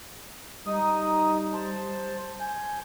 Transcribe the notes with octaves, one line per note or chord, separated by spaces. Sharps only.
G3 D#4 D#6
C5 A5
G#5 G6